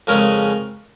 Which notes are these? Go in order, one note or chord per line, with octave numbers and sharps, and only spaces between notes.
F2 C#3 G#3 C#4 A#4